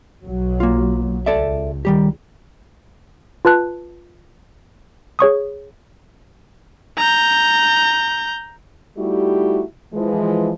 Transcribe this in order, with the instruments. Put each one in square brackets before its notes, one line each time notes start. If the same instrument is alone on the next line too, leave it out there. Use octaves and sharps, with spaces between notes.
[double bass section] B1 F#3
[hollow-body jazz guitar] A#3 F4
[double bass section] C#2 [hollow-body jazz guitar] A4 D5 E5
[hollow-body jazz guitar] D#3 G3 G4
[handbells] F4 B4 A5 F#6
G#4 C#5 C#6 D#6
[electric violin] A#5 G6
[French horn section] G3 A3 D#4 E4 F#4 G4
E3 F3 G#3